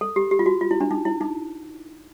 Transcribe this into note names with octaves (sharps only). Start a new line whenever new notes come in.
A4
G4
G4
F4
F#4
F4
E4
D4
D#4
E4
D#4